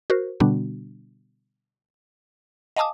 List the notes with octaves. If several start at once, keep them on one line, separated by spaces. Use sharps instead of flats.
F#4 A#4 C5
B2 D3 G3 B3 D4 F#4
D#5 F5 G#5 A5 D6 D#6